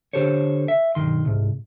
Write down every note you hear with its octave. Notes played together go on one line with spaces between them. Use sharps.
D3 G4 A4 C5 C#5
E5
B1 G2 D#3 C6
C2 G#2